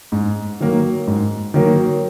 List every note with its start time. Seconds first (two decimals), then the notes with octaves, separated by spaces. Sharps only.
0.12 G#2
0.60 D#3 F#3 A#3
1.07 G#2
1.54 D#3 F#3 A#3